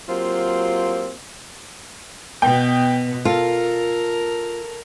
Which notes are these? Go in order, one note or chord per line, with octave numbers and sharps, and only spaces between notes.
F#3 A#3 C4 F4 G4
B2 B3 G5
F4 A4 A#4